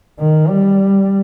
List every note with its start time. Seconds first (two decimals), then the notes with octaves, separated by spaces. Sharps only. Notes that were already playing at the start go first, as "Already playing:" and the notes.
0.19 D#3
0.49 G3